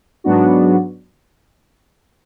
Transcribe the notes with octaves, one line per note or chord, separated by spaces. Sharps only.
G#2 F#3 B3 D4 F#4